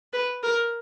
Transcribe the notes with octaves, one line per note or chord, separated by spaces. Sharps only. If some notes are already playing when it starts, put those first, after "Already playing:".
B4
A#4